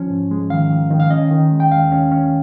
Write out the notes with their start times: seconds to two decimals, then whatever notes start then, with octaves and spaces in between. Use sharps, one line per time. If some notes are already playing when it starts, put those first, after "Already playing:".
Already playing: F3 C#4
0.10 G#2
0.31 G#3
0.50 D#3 F5
0.70 D#3
0.90 D#3
1.00 F5
1.10 C#4 D#5
1.31 D#3
1.52 G#3
1.60 G5
1.71 D#2 F5
1.92 C#4
2.11 C#4